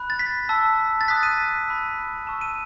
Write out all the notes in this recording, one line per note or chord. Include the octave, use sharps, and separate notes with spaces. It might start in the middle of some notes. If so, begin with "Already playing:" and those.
Already playing: B5 F#6
A6
B6
A5 E6
A6
A5 D#6 F#6 B6
D#7
B5 E6
A5 C#6 E6 E7
D#7